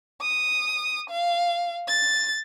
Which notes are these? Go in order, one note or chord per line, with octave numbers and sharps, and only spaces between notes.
D#6
F5
A6